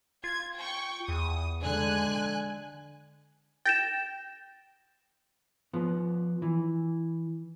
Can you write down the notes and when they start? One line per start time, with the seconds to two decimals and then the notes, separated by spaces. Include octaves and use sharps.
0.24 F4 G#6
0.57 G5 C#6
1.08 E2 D#6
1.63 D3 G#3 G#5 F#6
3.65 G5 A6 A#6 E7
5.74 F3 B3
6.42 E3